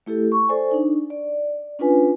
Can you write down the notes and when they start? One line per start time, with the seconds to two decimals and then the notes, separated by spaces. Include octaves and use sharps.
0.06 A3 E4 G4 A4
0.32 C#6
0.49 A4 C5 D5 G#5
0.71 D4 D#4
1.10 D5
1.79 C#4 D4 F4 B4 G#5